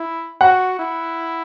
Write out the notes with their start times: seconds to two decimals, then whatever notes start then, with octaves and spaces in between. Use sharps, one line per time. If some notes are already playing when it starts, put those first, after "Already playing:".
Already playing: E4
0.41 F#4 F#5
0.79 E4